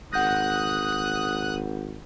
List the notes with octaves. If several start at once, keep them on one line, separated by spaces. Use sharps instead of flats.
G#1 F#5 D#6 F#6 G6 A#6